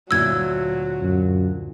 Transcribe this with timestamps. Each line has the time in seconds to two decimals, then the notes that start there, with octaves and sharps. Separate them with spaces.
0.11 D2 A#2 F#3 E4 E6 G#6
1.01 F#2